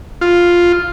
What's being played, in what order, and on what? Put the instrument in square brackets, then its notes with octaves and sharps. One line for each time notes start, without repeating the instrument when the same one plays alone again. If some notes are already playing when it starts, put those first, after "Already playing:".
[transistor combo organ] F4